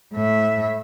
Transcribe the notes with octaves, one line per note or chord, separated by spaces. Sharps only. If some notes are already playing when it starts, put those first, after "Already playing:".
A2 E5